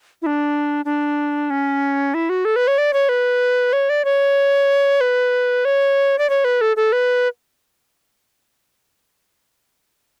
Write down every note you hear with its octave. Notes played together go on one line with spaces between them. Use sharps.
E4
D4
D4
C#4
E4
F#4
A4
B4
C#5
D5
C#5
B4
C#5
D5
C#5
B4
C#5
D5
C#5
B4
A4
A4
B4